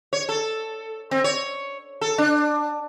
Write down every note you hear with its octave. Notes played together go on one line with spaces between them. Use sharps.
C#5
A4
C4
C#5
A4
D4